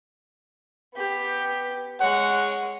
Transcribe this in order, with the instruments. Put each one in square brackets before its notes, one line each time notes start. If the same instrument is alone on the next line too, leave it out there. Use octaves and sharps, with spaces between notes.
[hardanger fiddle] B3 G4
[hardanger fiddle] G#3 C#5 [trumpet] F#5